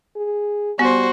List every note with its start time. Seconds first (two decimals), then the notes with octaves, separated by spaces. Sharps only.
0.16 G#4
0.79 G3 B3 F#4 C5